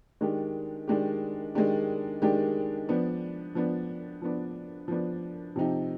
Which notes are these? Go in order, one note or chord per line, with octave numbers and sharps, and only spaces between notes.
D#3 G#3 D4 G4
D#3 G#3 D4 G4
D#3 G#3 D4 G4
D#3 G#3 D4 G4
F3 B3 D4
F3 B3 D4
F3 B3 D4
F3 B3 D4
C3 F3 C4 D#4 G4